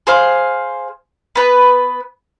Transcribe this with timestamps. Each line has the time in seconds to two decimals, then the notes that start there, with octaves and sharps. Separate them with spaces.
0.07 G#4 C5 F5
1.36 B3 B4